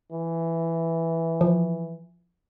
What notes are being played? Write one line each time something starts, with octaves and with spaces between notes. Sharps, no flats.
E3
F3